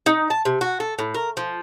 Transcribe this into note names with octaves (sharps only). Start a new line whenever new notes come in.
D#4
A5
C3
F#4
A4
A2
A#4
F3